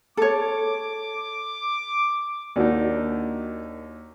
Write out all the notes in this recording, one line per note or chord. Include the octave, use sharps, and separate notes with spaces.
A4 C#5 D6
D#2 A#3 D4 D#4 F#4